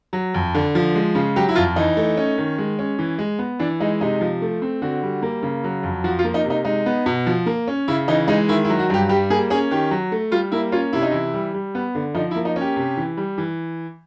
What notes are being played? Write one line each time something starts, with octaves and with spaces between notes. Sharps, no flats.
F#3
F2
D3
F3
G#3
C#3
F#3 G4
E4
F2 F4
E3 D#4
A3
C#4
D#3
G#3
C#4
E3
G#3
B3
E3 D4
G#3 D#4
C3 D#4
F3
A3
C4
D3 F#4
G3
A#3
C#3
F#3
F2
F3 F#4
F4
A#3
D#4
C3
D#4
G#3 D#4
B3
B2
F3
A#3
C#4
C#3 E4
E3 D#4
G#3 D#4
D#3 E4
E4
F#3
F#4
G2 G4
G3 G4
A#3 G#4
C#4 G#4
D#3 G4
F#3
A3
G3 F4
A#3 E4
C#4 F4
C3 E4
D#4
E3 E4
G3
G3
B3
D3
F3 D#4
E4
A#3
D#4
C#4 G4
C3
E3
G3
E3